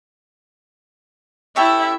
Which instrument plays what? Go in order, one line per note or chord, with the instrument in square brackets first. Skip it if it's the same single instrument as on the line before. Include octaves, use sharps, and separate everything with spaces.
[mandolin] C#4 G4 A4 [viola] E4 E5